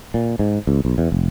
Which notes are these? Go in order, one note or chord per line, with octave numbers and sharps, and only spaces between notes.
A#2
G#2
C#2
B1
E2
F1